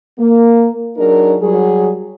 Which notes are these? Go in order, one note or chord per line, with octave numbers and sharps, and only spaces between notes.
A#3
F#3 D4 D#4 G#4 A#4
F#3 G3 G#4